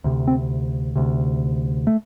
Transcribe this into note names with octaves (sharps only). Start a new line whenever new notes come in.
D2 C3
C4
D2 C3
A3